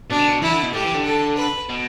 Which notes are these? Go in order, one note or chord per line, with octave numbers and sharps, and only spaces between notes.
B2 D4
D3
B2
E3 E4
D3
B2
A2 G4
E3
D3
A4
B4
B2